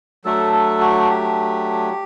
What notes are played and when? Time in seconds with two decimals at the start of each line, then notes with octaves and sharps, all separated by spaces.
0.25 F#3 A3 D4 A4
0.52 A4
0.81 F#4
1.10 G4